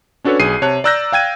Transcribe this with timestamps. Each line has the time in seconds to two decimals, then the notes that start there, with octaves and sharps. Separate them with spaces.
0.24 C#4 D4 F#4 A4 B4 C#5
0.39 B1 G#4 C7 D#7
0.62 C3 C#5 A5 F#6
0.84 D5 A#5 E6 F#6 G6 A#6
1.12 F5 G5 G#6 D#7